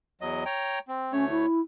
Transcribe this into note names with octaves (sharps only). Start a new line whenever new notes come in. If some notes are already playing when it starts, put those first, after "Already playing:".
E2 F#3 D#5
C#5 G5 A#5
C4
D2 A3 C#4 C#5
E4